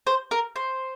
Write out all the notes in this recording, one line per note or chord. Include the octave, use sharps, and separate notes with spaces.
C5
A#4
C5